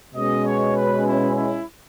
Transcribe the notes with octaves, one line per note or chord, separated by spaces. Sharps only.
B2 G#3 C#4 D#5
C#5
B4
E4
E4